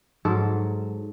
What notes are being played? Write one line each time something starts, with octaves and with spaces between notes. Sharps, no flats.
G#2 F#3 A4